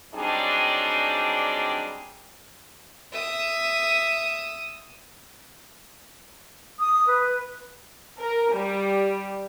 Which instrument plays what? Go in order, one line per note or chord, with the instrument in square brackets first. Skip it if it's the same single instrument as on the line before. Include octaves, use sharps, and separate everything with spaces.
[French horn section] F#3 G3 C4 D4 D#4 G#4
[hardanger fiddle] E5 D#6
[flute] D#6
B4
[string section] A#4
G3